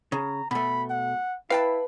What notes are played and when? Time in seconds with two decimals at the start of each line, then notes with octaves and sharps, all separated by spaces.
0.12 C#3 A#5
0.51 B2 A3 B5
0.90 F#5
1.50 E4 B4 F5 G5 A5 B5